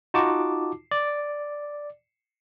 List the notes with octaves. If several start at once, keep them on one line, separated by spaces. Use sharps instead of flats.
D#4 F4 F#4 A5 D6
D5